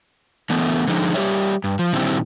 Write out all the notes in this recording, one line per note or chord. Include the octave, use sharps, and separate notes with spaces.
D3 E3 A3 B3
D3 F3 G#3 D#4
G3 G4 C5 C#5 E5
G2
F3
A#2 D3 D#3 G3 C4 E4